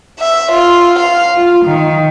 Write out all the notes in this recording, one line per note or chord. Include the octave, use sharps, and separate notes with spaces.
E5
F4
F5
F4
D#3